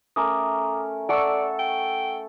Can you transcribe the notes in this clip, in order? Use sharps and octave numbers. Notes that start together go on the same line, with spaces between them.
A3 C#4 A#4 A#5 D6 D#6
A4 D5 F#5 C#6 E6
G5